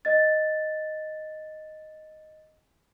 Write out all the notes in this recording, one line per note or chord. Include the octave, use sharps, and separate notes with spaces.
D#5 A6